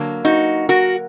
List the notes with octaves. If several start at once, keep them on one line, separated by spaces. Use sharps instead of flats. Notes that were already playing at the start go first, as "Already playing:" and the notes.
Already playing: D3 F#3 A#3
D#4 F#4
F#4 A#4